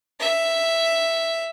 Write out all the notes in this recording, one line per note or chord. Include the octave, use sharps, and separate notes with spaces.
E5